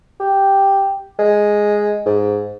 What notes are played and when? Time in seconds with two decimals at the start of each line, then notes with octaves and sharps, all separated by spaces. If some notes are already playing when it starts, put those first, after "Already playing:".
0.20 G4
1.19 G#3
2.06 G#2